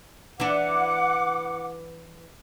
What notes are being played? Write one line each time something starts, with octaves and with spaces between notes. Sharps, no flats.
E3 D4 F#5 D6